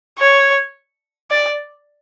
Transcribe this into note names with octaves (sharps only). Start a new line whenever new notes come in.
C#5
D5